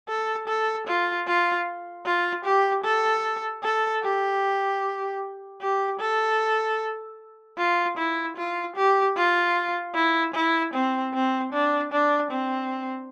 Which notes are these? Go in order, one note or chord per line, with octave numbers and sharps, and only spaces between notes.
A4
A4
F4
F4
F4
G4
A4
A4
G4
G4
A4
F4
E4
F4
G4
F4
E4
E4
C4
C4
D4
D4
C4